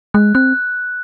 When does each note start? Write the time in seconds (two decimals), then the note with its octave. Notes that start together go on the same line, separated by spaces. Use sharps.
0.14 G#3 F#6
0.35 C4 F#6